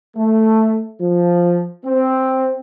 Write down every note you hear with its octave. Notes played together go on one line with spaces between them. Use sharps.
A3
F3
C4